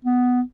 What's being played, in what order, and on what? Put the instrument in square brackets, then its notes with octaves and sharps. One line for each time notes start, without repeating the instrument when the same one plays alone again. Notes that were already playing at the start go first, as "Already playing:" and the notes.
[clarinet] B3